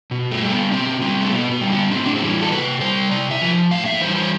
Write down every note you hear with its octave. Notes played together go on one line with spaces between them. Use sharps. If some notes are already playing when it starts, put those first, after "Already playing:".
B2
A3
G3
B3
B2 C4
G3 C4
A3
B2 B3
B3
G3
B3
A2 C4
D4
C4
E3 G3
A4
C3 B4
G3 C5
C3 D5
E5
F3
A2 F5
E5
E3 G3 C5
C5